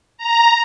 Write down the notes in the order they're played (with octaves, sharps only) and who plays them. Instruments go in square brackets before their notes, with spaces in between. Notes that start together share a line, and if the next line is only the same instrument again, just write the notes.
[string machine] A#5